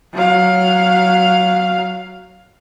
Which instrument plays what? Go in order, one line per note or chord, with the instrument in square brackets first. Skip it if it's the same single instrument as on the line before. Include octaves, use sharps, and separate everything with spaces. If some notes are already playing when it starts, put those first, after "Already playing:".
[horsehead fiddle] F#3 F5